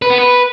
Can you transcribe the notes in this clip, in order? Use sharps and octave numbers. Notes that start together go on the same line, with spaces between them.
B4
B3
B4